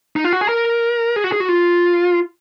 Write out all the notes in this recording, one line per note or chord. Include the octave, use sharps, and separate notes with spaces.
D#4
F4
F#4
G#4
A#4
G#4
F#4
G#4
F#4
F4